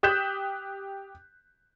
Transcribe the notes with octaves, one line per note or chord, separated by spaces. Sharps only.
G4 D#6 F#6 G6 B6 E7